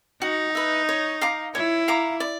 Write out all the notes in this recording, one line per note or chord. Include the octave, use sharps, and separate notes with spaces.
D#4 F#4
B4 E5
C#5
F5 A#5 D6
E4 C#5
F5 A#5 D6
D5